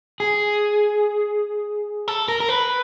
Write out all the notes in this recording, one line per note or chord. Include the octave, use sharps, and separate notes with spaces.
G#4
A4
A#4
A#4
B4